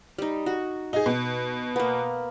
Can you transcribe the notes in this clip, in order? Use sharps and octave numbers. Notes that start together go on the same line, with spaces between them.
G3 D#4
F#4
D#4 G#4
B2
A#3 B3